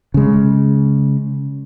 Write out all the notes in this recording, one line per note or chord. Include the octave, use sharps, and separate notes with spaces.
C#3 G#3